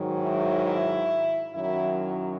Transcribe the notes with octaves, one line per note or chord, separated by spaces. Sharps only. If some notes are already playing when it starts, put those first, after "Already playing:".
Already playing: G#2 D#3 F#3
E4
E4
F#2 D#3 F#3 E4